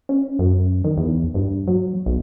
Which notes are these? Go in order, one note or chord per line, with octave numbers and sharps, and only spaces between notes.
C#4
F#2
D#3
E2
G2
F#3
B1